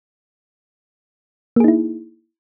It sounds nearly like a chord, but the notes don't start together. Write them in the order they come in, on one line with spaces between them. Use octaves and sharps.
A#3 G#4 D#4 E4